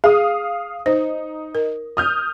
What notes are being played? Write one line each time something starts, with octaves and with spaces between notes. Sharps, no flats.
G#4 F5 D#6
D#4 C5
A#4
D#6 F6 G6